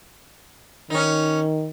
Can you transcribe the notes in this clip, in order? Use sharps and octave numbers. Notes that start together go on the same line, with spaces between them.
D#3 C#4 D#4